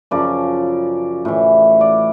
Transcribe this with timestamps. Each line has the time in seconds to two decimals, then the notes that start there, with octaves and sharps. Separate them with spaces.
0.11 F#2 C#3 F3 D5
1.25 A2 E3
1.81 D5